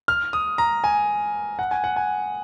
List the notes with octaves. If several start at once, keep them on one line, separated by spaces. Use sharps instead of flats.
F6
D#6
A#5
G#5
F#5
G#5
F#5
G#5